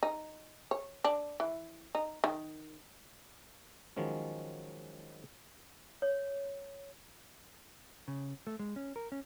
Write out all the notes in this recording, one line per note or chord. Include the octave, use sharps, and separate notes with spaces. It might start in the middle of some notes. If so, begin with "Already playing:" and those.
D#4
C#5
D4
E3
D#4
D#3
D#3 F3 F#3 G#3 C#4
C#5
C#3
A3
G#3
C#4
A#4
C#4